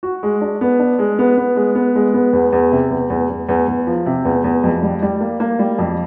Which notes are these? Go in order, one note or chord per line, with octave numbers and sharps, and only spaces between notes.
F#4
G#3
D4
B3
D4
G#3
B3
B3
G#3
B3
G#3
B3
E2
E2
C3
E2
E2
E2
E2
E2
F3
C3
E2
E2
F2
G3
G3
A#3
A#3
G3
F2